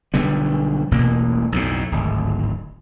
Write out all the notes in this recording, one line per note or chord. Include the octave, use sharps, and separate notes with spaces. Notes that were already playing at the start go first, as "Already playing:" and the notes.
B1 D3 G3 B3
E1 A1 B2 A#3
B1 F2 A2
D1 G#1